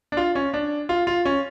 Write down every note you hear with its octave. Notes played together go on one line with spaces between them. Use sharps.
D4
F4
C#4
D4
F4
F4
C#4